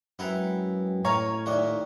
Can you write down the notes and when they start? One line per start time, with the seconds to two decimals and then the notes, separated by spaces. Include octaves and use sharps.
0.19 F#2 G#3 B3 E4 B4 G5 A#5
1.05 A2 C#5 F5 G#5 A#5 C#6
1.46 D#2 A#2 D#4 E5 G5